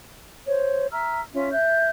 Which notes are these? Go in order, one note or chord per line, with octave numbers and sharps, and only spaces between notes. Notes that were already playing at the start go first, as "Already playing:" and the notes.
C5 C#5
E5 A#5 E6 F6
C#4 F4 E5 G#5
E5 F#6 G6